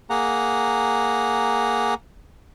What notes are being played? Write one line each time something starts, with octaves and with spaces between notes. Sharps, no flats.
A#3 G#4 F#5 A#5